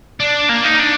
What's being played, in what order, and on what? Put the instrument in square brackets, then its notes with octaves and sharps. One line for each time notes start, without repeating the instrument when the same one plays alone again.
[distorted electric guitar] D4
A#3
D#4
D4